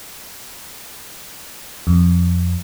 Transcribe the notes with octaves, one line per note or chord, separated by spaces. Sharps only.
F2